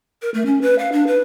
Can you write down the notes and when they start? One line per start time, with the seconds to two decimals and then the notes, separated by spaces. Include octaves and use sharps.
0.22 A#4
0.34 A3
0.46 C#4
0.62 B4
0.79 F5
0.92 D4
1.07 B4